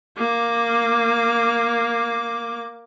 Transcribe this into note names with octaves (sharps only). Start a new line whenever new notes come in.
A#3 D6